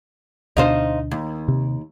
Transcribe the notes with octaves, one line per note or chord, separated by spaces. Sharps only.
D2 B2 D4 D#4 F4 C5
D#2
C3